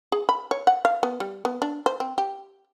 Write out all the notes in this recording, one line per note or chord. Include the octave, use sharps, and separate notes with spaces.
G#4
B5
C#5
F#5
F5
B3
G3
B3
D4
C5
C4
G4